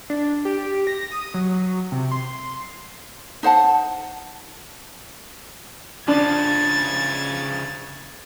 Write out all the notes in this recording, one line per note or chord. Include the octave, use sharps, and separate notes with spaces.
D4
G4
A#6
D#6
F#3
C3
C6
D#4 C5 F#5 A5
C#3 F3 D4 G#6 A6